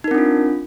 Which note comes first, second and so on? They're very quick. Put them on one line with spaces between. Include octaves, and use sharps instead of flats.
D#4 A#4 C4 D4 F4